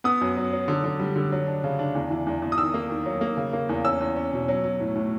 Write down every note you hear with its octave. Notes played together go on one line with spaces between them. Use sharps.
B3 D#6
F#2
F#3
F#3
D3
D3
G3
D3
F#3
D4
C#3
D4
E2
E3
E2
E2
D#6
D#3 E6
A#3
D#3
F#3
A#3
C#3
A#3
E2
C#4 E6
E2
C#4
B2
F#3
F#3
A2
A2